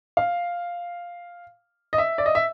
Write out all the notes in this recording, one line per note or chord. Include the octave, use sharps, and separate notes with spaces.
F5
D#5
E5
D5
D#5
E5